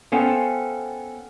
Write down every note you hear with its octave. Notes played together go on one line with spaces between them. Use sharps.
B3 C#4 A4 C5 F5 G5